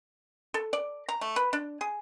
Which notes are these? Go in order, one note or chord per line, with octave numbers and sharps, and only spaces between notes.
A4
D5
A#5
A3
B4
D4
G#4